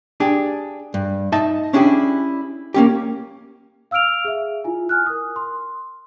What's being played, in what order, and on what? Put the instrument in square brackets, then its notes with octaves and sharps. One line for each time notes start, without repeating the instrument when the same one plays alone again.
[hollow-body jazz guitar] D4 G4 G#4
G2
D#4 D#5 E5 A5
C#4 D4 E4 G4 G#4
A#3 C#4 G4
[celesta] F5 E6 F6 D7 F7
G#4 E5
E4 F4 G#5
G#5 F6 F#6
A#4 D#6
C6